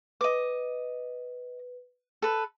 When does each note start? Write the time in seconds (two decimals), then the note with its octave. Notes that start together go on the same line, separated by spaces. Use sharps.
0.21 B4 D#5 D6
2.22 A4 B4